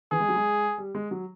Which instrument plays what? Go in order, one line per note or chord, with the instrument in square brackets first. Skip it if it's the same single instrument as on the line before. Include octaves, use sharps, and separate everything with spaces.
[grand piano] E3 [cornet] G#4
[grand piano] G#3
F#3
G#3
G3
G#3
F#3